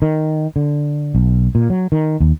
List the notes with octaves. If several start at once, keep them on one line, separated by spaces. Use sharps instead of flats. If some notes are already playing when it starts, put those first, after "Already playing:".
D#3
D3
B1
A#2
F#3
D#3
D#2